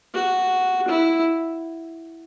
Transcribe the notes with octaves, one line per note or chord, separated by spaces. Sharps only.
F#4
E4